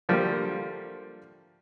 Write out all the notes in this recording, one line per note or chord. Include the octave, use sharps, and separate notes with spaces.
D3 F3 G3 A3 A#3